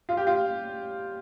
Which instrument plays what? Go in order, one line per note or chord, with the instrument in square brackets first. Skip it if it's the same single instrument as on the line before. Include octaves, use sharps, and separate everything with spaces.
[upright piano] F4
G4
F4